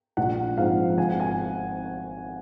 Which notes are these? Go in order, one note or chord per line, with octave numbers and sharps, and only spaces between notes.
A#1 F#5
G#2 F3 C4 F5
G#1 G#5
F#5
G#5